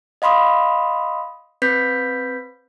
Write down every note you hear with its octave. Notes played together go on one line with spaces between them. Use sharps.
D#5 F5 B5 C6 D#6
C4 B4 G6 B6